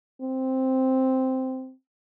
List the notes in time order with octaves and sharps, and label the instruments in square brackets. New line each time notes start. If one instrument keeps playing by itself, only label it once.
[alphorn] C4